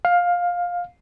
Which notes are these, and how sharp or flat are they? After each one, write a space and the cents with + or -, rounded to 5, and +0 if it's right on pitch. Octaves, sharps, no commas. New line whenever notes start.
F5 +15